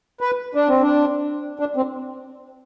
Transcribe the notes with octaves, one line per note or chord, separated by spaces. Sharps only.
B4
D4
C4
D4
D4
C4